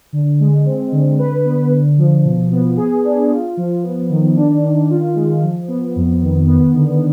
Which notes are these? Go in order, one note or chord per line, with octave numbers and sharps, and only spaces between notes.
D3
G#3
C4
D3
B4
B3
D3
F3
B2
B3
G#4
D4
F4
F3
B3
D#3
D4
D#3
F4
G#3
F3
B3
F2
D#3
B3
D3